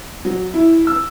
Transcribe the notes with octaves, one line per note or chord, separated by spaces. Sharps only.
F#3
E4
E6